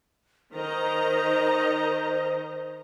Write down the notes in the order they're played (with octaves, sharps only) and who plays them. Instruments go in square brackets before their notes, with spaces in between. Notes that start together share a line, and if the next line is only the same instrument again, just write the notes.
[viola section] D#3 D#5 A#5 [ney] C5